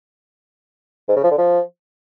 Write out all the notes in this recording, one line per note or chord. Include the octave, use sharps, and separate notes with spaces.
G#2
C#3
F3
D3
F3